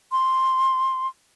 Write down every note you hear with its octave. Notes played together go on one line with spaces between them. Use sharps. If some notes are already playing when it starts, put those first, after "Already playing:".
C6